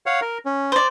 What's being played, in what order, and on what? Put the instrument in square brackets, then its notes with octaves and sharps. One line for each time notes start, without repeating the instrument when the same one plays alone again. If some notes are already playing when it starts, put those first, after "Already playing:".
[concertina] C#5 F5 F#5
A#4
C#4
[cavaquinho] C5 D5